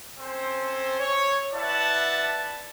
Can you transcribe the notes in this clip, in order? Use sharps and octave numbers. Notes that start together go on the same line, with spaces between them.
C4 C#4 A4 C5
C#5
E4 B4 D5 E5 F#5 A5